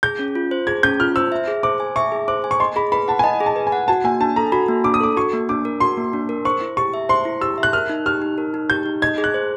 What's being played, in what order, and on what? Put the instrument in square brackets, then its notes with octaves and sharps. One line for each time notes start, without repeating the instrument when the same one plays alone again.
[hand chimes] G#4 [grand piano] G6
[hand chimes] C#4
F4
C5
[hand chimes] G#4 [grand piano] G#6
[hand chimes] C#4 [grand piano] G6
[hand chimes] F4 [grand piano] F6
[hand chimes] C5 [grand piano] E6
[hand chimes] E5
G#4
[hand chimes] C5 [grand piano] D6
[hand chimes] G#5
[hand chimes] E5 [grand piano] C#6
[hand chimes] G#4
[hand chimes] C5 [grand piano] D6
[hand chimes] G#5
[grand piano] C#6
[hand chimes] D#5 [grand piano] C6
[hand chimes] G#4 [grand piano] B5
[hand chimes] B4 [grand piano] B5
[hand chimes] F#5 [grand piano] A5
[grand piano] G#5
[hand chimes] D#5 [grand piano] A5
[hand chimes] G#4
[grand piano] A5
[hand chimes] B4
[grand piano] G#5
[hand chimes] F#5
[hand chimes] F#4 [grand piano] A5
[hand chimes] A#3 [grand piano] G#5
[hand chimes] D4 [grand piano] A5
[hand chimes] A4 [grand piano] A#5
[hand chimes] F#4 [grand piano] B5
[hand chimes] A#3
[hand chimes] D4 [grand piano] D6
[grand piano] D#6
[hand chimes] A4 [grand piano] D6
[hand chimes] F#4 [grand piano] C#6
[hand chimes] A#3
[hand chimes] D4 [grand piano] D6
[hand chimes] A#4
[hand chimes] F#4 [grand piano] C6
[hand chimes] A#3
D4
A#4
[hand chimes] C5 [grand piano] C#6
[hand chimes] E4
[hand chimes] G4 [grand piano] C#6
[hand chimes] E5
[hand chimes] C5 [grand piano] C6
[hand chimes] E4
[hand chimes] G4 [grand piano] E6
[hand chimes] E5
[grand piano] F#6
[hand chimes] A#4 [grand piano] F6
[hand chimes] D#4
[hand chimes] G4 [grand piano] F6
[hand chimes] D#4
A#4
D#4
[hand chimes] G4 [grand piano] G6
[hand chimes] D#4
[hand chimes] D#5 [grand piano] G#6
[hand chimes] G#4
[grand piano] F#6
[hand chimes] C5